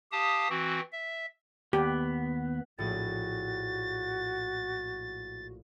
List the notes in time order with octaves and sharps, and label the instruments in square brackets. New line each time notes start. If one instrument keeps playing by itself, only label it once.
[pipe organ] G4 F5 A5 D#6
E3 C4 F#4
E5
[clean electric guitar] D#2 [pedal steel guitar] B3 [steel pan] G4
[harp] A#1 A2 [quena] F#4 [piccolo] A6